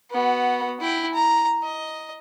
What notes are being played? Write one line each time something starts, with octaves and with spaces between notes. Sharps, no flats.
B3 F#4
E4 G5
A#5
D#5